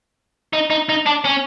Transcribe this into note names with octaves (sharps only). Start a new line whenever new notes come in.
D#4
D#4
D#4
D4
C#4